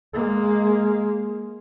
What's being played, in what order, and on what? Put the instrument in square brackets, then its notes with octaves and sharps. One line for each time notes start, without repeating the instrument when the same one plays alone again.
[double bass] G#3 A#3